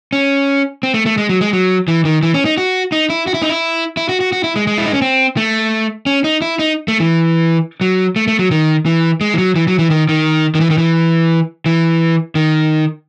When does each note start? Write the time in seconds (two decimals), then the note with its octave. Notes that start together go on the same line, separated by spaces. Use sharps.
0.13 C#4
0.83 C4
0.94 A3
1.06 A3
1.18 G#3
1.29 F#3
1.41 G#3
1.53 F#3
1.88 E3
2.05 D#3
2.23 E3
2.34 C#4
2.45 D#4
2.58 F#4
2.92 D#4
3.10 E4
3.27 F#4
3.34 E4
3.42 D#4
3.49 E4
3.97 E4
4.09 F#4
4.20 F#4
4.32 F#4
4.44 E4
4.56 G#3
4.67 G#3
4.78 E4
4.86 D#4
4.94 C#4
5.02 C4
5.37 A3
6.06 C#4
6.24 D#4
6.42 E4
6.59 D#4
6.88 A3
7.00 E3
7.81 F#3
8.16 A3
8.28 A3
8.39 F#3
8.51 D#3
8.86 E3
9.21 G#3
9.34 E3
9.38 F#3
9.56 E3
9.68 F#3
9.79 E3
9.90 D#3
10.09 D#3
10.55 D#3
10.61 E3
10.70 D#3
10.78 E3
11.66 E3
12.35 D#3